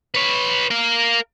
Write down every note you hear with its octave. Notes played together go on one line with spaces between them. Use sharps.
B4 C#5
A#4 F5